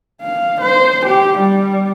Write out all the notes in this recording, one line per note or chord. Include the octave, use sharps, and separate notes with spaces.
F5
C5
G4
G3